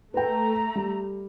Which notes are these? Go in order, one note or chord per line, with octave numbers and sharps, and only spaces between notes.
A3 B4 G5 A#5
G3